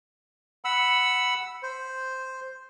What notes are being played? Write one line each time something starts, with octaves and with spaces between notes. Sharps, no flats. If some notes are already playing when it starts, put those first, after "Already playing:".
F#5 B5 E6
C5